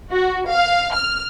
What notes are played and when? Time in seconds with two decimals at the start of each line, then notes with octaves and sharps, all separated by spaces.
0.11 F#4
0.50 F5
0.93 F6